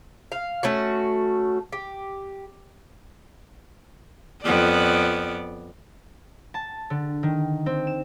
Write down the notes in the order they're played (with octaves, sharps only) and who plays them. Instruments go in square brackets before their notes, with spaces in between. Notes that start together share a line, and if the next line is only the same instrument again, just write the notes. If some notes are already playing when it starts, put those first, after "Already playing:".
[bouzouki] F5
A3 C#4 F#4
G4
[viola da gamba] F2 B3 D5
[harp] A5
D3
D#3
C4
E7